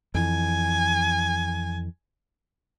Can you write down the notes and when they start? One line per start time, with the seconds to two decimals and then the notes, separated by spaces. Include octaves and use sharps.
0.14 F2 E3 G#5